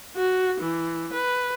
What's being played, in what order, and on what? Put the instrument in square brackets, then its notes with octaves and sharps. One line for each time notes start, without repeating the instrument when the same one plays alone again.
[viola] F#4
E3
B4